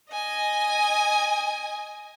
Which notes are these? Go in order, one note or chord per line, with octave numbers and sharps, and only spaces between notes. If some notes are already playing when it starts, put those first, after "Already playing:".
D#5 G#5